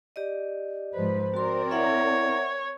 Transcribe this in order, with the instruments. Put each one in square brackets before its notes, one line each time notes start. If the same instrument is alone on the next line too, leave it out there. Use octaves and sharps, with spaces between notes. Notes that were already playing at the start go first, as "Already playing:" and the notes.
[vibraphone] G4 D5 D#5
[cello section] G#2 F3 B4 [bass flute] C5
[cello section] C4 A#4 D5 [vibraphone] F#4 C6
[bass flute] E4 [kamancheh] C#5 [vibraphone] E5 F#5